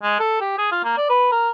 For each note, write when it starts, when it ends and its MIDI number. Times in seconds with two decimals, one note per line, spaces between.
0.03 0.18 56
0.19 0.39 69
0.41 0.54 67
0.59 0.69 68
0.72 0.81 65
0.84 0.95 58
0.97 1.06 74
1.09 1.30 71
1.31 1.50 70